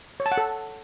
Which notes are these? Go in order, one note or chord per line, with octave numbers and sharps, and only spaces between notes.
C#5
A5
F#5
A4